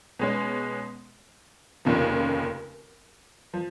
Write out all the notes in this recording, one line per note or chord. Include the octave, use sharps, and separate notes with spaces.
B2 G#3 C#4
F1 D#2 C#3 F3
F3